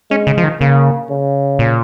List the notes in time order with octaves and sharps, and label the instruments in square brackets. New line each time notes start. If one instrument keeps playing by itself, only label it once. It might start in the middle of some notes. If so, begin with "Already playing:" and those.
[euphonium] G#3 [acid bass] C#4
[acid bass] C#3
F3
D#3
[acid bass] C#3 [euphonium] A#3
[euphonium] C#3
[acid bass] A#2